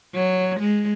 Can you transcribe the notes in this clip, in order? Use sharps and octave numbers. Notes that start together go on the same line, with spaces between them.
F#3
G#3